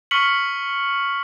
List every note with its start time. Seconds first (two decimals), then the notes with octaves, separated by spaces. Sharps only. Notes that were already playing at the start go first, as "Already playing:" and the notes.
0.11 C#6 F6 B6 C#7 F#7